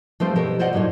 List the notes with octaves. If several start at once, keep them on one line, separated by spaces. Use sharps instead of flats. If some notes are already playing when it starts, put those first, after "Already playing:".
F3 G3 A3 C4 A4 C5
B2 B3 G4 A4 A#4
F4 C5 D5 D#5 F#5
F2 A2 F#3 G3 D#4 F4